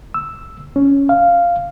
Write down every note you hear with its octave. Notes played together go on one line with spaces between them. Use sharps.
E6
C#4
F5